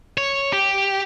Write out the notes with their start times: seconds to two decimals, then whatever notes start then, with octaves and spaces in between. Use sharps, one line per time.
0.17 C#5
0.53 G4